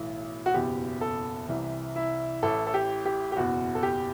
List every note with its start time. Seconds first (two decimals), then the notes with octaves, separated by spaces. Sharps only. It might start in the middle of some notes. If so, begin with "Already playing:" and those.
Already playing: B1 A2 E3
0.46 F#4
0.54 F#1 E2 B2 G4
1.01 A4
1.48 C2 C3 E3
1.96 E4
2.43 A1 A2 E3 A4
2.67 A4
2.74 G4
3.05 G4
3.32 G4
3.36 F#1 E2 B2 F#4
3.75 A4
3.83 G4